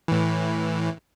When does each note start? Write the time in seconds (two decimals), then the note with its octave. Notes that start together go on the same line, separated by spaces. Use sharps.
0.08 A2 E3